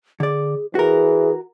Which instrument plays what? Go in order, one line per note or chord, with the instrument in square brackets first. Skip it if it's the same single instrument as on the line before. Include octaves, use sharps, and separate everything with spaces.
[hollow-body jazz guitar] D3 D5 [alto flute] G#4
[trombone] E3 [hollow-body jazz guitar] F#4 A#4 [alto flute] G#4